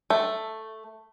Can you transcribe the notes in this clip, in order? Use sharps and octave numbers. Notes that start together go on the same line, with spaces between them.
A3